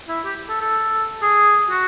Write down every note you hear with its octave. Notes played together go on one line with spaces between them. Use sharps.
E4
G4
A4
A4
G#4
F#4